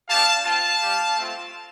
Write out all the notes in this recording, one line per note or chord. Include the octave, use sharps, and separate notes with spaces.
B3 D4 G4 F5 A5
C4 F4 F5 A5
G3 D4 G4
A3 C4 F4